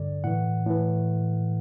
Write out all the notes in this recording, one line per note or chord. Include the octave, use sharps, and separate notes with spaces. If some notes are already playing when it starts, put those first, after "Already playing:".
Already playing: G2 D3 D5
A2 E3 F#5
A2 E3